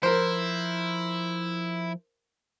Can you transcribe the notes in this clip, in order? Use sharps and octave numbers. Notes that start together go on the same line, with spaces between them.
F3 E4 A#4 C5